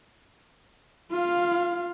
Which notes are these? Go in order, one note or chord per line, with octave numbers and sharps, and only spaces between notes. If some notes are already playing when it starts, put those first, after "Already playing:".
F4 F5